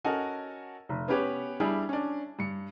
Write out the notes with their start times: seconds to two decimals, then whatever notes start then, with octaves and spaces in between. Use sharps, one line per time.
0.04 C#4 F#4 A4 A#4 D#5 G#5
0.89 F1
1.08 B3 C#4 G4 B4 C#5
1.60 G3 D4 E4 G4 G#4
1.89 C#4 D4
2.39 G2 C#7